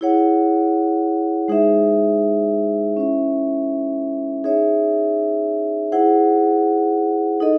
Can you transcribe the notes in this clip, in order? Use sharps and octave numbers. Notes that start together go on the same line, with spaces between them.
E4 G#4 C#5 F#5
G#3 D#4 G#4 C5 E5
C#4 E4 C5 E5
D#4 G#4 C#5 E5
E4 G#4 C5 F#5
D#4 A4 D#5